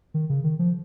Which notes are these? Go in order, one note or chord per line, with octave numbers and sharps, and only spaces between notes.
D#3
C#3
D#3
F3